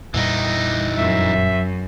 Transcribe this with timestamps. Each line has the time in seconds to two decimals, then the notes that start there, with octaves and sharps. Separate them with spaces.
0.14 F2 A#2 E3 G3 D#4
0.98 F#2 E5